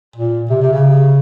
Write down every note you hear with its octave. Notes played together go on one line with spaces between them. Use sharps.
A#2
C3
C3
C#3